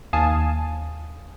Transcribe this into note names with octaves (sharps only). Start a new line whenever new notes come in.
D#2 F5 G#5 A5 D#6